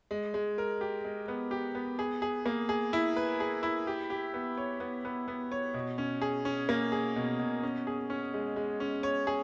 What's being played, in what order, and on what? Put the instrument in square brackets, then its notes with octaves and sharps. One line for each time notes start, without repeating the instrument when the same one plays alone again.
[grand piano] G#3
G#3
A#4
G4
G#3
B3
G4
B3
G#4
G#4
A#3
G#4
E4
B4
G#4
E4
G4
G4
B3
C#5
B3
B3
B3
C#5
B2
C#4
G#4
C#4
A#3
G#4
B2
B2
C#4
G#4
C#4
G#3
G#3
C#4
C#5
G#4